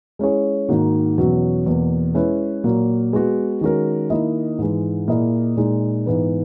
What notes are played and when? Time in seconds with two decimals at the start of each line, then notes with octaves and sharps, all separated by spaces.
0.19 G#3 C#4 E4 G#4 C#5
0.69 G#2 D#3 A#3 D#4 F#4
1.18 E2 B2 F#3 C#4
1.66 E2 B2 A#3
2.14 G#3 C#4 E4 B4
2.64 A#2 F#3 A#3
3.13 G#3 B3 F#4
3.61 D#3 G#3 C#4 F#4 A#4
4.10 D#3 A#3 E4 A#4 D#5
4.58 G#2 E3 G#3
5.08 A#2 A#3 E4 G#4 D#5
5.57 A#2 G#3 D#4
6.06 G#2 E3 B3